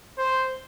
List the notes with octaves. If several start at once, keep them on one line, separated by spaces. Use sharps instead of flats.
C5